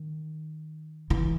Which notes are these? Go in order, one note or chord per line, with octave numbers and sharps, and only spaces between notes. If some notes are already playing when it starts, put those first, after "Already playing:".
Already playing: D#3
E3